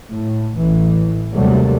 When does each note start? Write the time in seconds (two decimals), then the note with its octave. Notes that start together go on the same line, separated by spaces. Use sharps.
0.12 A2
0.55 A1 E3
1.33 D#2 C3 F#3 G3 A3